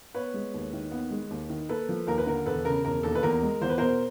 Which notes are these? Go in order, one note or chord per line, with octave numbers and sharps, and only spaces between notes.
B3 B4 C#5
G#3
D#2
D#3
B3
G#3
D#2
D#3
A#3 A4 B4
F3
D#2 A#4
B4
D3 A#4
E1 A4 B4
C#3 A#4
E1 A#4
D#2 A4
B4
E2 A#4
G#3
E2 C5
B4
B2 A#4 C5